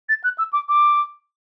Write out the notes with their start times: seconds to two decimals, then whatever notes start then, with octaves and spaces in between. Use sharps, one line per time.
0.09 A6
0.24 F#6
0.38 E6
0.53 D6
0.69 D6